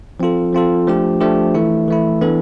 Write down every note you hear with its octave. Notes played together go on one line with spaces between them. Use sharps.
F3 C4 F4 A4
F3 C4 F4 A4
F3 A3 D4 G4
F3 A3 D4 G4
E3 A3 E4
E3 A3 E4
E3 B3 D4 A4